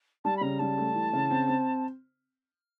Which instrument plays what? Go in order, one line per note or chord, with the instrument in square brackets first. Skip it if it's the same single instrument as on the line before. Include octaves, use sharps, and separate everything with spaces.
[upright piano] G3 [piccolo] A5
[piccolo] B5
[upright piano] C#3 [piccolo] A#5
[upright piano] G3 [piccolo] A5
[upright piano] A3
E3
C#3
C4
C4